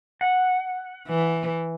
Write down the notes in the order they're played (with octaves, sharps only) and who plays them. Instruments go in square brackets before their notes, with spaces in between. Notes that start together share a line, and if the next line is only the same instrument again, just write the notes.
[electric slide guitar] F#5
[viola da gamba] E3